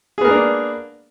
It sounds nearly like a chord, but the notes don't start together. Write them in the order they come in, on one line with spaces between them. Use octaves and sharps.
G#4 B3 A#4 A#3 D4